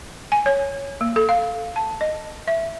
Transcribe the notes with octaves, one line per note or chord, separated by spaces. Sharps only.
G#5
C#5
A#3
A4
F5
A5
D#5
E5